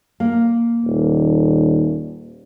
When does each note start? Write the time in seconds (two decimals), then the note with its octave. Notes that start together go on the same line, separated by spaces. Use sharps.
0.20 A#3
0.85 D#1